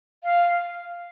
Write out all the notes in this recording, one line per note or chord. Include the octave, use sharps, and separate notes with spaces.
F5